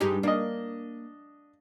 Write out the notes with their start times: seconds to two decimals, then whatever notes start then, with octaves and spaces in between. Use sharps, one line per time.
0.01 G2 G#3 D#4 G4
0.23 A#3 D4 D#5